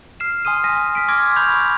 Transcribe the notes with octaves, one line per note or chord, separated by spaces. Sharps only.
F6 C7 E7
G#5 C6 D#6 F6 D#7
G#5 A#6 B6 D#7
F6 B6 D7
C6 D6 F6 G#6 A#6 D7
B5 C#6 G6 F7